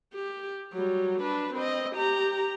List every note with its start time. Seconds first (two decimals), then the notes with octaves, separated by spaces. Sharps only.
0.14 G4
0.73 F#3 G3
1.21 D4 B4
1.54 C4 D#5
1.96 G4 A#5